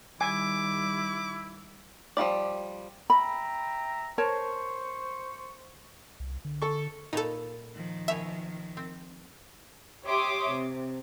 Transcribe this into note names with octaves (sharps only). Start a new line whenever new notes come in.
D#3 G3 E4 G#5 D6
F3 G3 E4 D5
E5 G5 A#5 B5
A#4 C5 C#5 A5 C#6
C2
D3
A4 C#6
A#2 D#4 A4 B4 C#5
D#3 F3
B2 C#5 E5 G#5
C4
G4 C#5 E5 C6 D6 D#6
C3